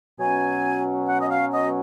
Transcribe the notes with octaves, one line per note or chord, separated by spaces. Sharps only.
B2 F#3 C#4 G#5
F#5
D#5
F5
D#5